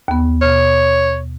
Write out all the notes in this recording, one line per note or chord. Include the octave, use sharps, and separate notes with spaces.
D#2 B3
B2 C#5 F6